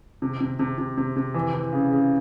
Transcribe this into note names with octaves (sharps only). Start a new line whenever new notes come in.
C3
C3
C3
C3
C3
C3
E3
E3
C#3
C#3